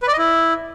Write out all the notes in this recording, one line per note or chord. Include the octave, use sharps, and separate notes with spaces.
B4
D5
D#5
E4